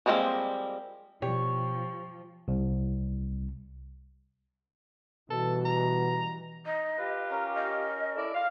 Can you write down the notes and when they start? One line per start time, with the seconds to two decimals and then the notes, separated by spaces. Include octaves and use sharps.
0.06 F3 G3 G#3 A#3 C4
1.22 B2 F3 G4 C#5 G5
2.48 C2
5.30 B2 E3 G3 A4
5.65 A#5
6.66 D#4 D#5
6.98 F4 G4 B4
7.31 C#4 A#4 A#5
7.55 D#5
8.16 E4 A4 D5
8.34 F5